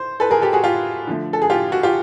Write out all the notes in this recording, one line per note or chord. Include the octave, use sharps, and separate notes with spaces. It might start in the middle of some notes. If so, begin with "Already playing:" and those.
Already playing: C5
A4 B4
G#4 A#4
G4 A4
F#4 G#4
F4 G4
D3 F3 A3
A4
G#4
F4 G4
F#4
F4 G4